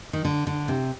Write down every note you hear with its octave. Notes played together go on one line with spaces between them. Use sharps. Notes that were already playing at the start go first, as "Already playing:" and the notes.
D#3
D3
D3
C3